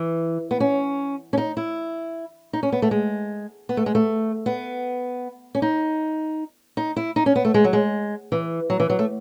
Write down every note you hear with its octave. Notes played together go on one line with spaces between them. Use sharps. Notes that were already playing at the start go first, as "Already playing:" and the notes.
Already playing: E3
B3
C#4
C#4
D#4
E4
D#4
C#4
B3
A3
G#3
B3
A3
G#3
A3
B3
C#4
D#4
D#4
E4
D#4
C#4
B3
A3
G#3
F#3
G#3
E3
F#3
E3
F#3
A3